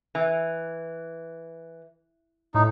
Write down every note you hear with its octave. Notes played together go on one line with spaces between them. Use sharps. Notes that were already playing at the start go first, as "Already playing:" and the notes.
E3
A2 D#4